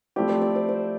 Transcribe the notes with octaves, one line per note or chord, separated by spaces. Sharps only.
F3 A3 C4 E4 G4 D5
D5
D5
C5
C5